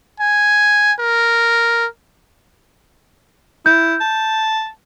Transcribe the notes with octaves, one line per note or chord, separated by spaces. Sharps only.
G#5
A#4
E4 G6
A5